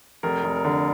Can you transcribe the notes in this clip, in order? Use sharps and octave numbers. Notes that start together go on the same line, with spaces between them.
F1 A#4
F1
A#4
D3